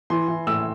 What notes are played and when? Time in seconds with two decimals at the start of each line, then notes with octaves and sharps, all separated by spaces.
0.10 E3 C6
0.28 E3
0.47 A2 E6